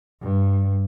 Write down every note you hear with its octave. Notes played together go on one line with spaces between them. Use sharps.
G2